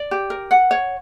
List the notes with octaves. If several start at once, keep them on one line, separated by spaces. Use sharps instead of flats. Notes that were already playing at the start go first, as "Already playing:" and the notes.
Already playing: D5
G4
A#4
F#5
C#5